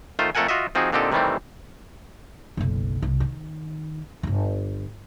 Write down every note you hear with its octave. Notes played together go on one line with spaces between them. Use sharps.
D#3 A3 F4 C5
F2 A3 A4 A#4 F#5 G#5
F4 F#4 D#5 E5
F3 C4 D#4 F#4 G#4
A#2 D3 C4 D#4 G4 A4
C3 D#3 E3 G3 A3 C4
F#1 B1
C2
D#3
D1 G1